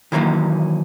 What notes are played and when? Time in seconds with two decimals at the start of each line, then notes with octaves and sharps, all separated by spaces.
0.12 D#3 E3 F#3 A#3 C#4